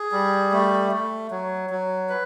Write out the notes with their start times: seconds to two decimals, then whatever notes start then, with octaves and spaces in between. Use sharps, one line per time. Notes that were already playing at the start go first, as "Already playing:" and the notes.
Already playing: G#4
0.12 G3
0.52 A3
0.92 A3
1.31 F#3
1.70 F#3
2.09 B4